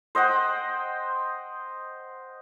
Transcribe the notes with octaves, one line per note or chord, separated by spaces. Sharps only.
C5 D#5 F#5 G5